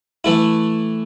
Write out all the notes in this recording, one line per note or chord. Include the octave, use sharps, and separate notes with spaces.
E3 A3 E4